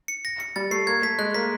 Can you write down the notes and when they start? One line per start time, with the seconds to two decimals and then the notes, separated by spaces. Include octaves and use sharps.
0.08 C#7
0.25 A#6
0.40 C#7
0.56 G3 A6
0.71 A3 C7
0.87 A#3 G#6
1.02 A3 B6
1.18 G#3 F#6
1.34 A#3 B6